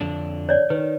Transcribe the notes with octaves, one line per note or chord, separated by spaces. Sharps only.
F2 D3 D4
C#5 D5
D#3 B4